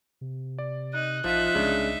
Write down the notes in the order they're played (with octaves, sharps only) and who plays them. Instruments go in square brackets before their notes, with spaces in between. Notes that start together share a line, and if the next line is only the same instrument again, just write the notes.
[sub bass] C3
[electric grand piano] D5
[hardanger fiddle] D#4 [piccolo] F#6
[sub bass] A1 [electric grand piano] F3 F4 [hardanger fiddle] D#4 E5
[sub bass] C2 [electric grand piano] C#3 G#3 D4